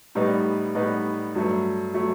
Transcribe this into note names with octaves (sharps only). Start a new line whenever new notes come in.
A2 G3 B3 D#4
A2 G3 B3 D#4
G2 F#3 A3
F#3 A3